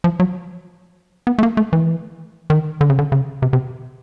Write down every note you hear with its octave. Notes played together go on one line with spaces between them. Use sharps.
F3
F#3
B3
A3
A#3
A3
E3
D#3
D3
C#3
D3
C#3
C3
C3